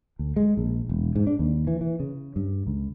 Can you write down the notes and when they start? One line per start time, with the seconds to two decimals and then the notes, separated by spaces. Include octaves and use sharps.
0.19 D2
0.36 G#3
0.57 A#1
0.89 E1
1.16 G#2
1.27 D4
1.39 D#2
1.67 E3
1.81 E3
2.00 C#3
2.36 G2
2.67 C#2